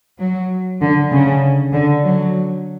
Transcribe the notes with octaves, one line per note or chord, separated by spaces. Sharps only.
F#3
D3
C#3
D3
F#3